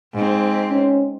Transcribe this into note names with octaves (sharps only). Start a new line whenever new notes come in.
G#2 C4
C#4